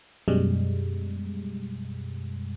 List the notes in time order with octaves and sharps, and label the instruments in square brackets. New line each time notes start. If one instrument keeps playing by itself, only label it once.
[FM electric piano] F#2 B2 G3 G#3